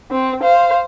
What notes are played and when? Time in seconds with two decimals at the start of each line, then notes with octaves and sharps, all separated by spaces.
0.11 C4
0.43 C5 F5